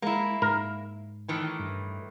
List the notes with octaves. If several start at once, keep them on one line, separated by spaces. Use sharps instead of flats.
G#3 A#3 E4
G#2 A#4
A2 D#3 E3
G2